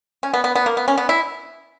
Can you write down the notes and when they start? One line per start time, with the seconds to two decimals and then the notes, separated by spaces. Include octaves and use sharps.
0.23 C#4
0.34 B3
0.44 B3
0.55 B3
0.66 A#3
0.77 B3
0.88 C#4
0.98 B3
1.09 E4